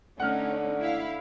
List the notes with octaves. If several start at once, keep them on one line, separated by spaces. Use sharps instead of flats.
D3 A3 C#4 D#4 F#5 F6
E4 F5